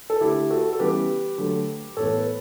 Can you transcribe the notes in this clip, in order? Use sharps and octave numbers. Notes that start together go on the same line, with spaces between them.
A4
D3 A3 E4 G4
F#4 A4
A4
C#3 E3 G3 B3 G4 B4
D3 F#3 A3
A2 E3 B3 A4 C#5
B4